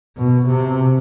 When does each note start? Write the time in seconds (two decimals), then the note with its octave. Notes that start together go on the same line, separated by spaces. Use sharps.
0.17 B2
0.48 C3